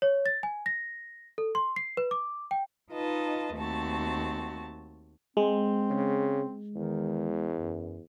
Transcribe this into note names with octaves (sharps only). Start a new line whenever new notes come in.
C#5
A6
G#5
A#6
A4
C6
C7
B4
D6
G5
D#4 F4 B4 D#5 A5
D#2 A3 C4 F#4 A5
G#3 C4
C#3
E2 D#3
F#2